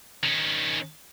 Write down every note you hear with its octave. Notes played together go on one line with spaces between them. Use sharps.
D#3 C#4